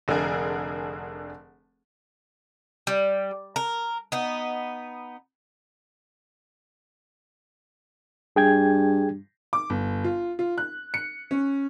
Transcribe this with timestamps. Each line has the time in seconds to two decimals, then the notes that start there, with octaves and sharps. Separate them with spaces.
0.08 F1 D3 D4 G#4 A#4
2.87 G3
3.56 A#4
4.12 B3 D#4
8.36 G2 G#4 G5 G#6
9.53 D6
9.70 G1
10.04 F4
10.39 F4
10.58 F#6
10.94 C#7
11.31 C#4